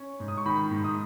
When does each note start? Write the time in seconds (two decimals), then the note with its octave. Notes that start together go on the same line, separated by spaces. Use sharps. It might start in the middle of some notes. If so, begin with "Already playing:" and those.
Already playing: C#4
0.20 G#2
0.28 D#6
0.37 C#6
0.46 D#3 B5
0.71 G#2
0.84 D#6